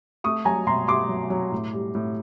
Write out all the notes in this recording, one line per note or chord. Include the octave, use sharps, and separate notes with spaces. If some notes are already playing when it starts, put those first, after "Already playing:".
A3 C#6 D#6
F#3 G#5 A#5
B2 A#5 C6
A3 C6 D6
F#3
F#3
A2
G3
A2